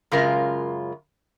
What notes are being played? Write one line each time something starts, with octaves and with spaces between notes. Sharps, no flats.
F#2 C#3 G#3 F4 A#4